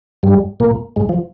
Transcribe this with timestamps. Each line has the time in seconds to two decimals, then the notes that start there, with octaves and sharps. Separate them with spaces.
0.23 G2 G3
0.60 A#2 A#3
0.96 G#2 G#3
1.09 F3